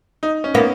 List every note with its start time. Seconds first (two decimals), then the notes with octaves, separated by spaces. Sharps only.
0.23 D#4
0.44 C#4
0.54 A#3 B3